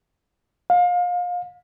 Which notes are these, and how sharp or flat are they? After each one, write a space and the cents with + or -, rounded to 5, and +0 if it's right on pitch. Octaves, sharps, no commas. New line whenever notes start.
F5 +30